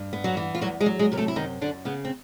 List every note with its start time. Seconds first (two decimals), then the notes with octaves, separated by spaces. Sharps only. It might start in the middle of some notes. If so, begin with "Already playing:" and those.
Already playing: G2
0.13 B3
0.24 F#3 F#4
0.37 E3
0.55 F4
0.61 E2 F#3 F#4
0.80 G#3 G#4
0.86 F#3
0.99 G#3 G#4
1.12 C3 A#4
1.17 A3 A4
1.28 E4
1.36 F#2 D#3 D#4
1.62 F#2 D3 D4
1.85 C#3 B3
2.05 C4